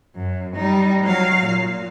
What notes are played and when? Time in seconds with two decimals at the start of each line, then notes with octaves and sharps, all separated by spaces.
0.16 F#2
0.55 G3 D#4
1.04 F#3 F5
1.46 A#2